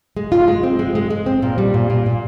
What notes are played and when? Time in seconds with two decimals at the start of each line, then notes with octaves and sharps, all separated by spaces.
0.17 G#3
0.32 F4
0.48 G#3
0.63 C4
0.79 G#3
0.95 G#3
1.10 G#3
1.26 C4
1.42 A#2
1.58 G3
1.74 A#2
1.90 A#2
2.06 A#2